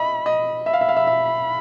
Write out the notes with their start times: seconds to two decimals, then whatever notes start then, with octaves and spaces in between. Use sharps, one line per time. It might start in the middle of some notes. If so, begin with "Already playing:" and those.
Already playing: D#5 E5 B5
0.26 D#5
0.66 E5 B5
0.73 F5
0.81 E5
0.89 F5
0.96 E5
1.07 E5